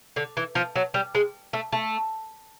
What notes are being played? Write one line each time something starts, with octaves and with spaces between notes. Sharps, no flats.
D3
E3
F3
F#3
G3
G#3
A3
A3